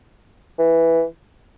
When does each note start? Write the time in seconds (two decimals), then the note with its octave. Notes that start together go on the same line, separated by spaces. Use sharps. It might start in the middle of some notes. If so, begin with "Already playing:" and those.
0.59 E3